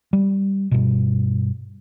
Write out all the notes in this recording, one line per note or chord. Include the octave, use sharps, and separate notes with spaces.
G3
G2 B2